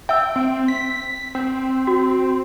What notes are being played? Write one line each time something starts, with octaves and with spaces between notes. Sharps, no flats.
E5 G5 E6
C4
B6
C4
F#4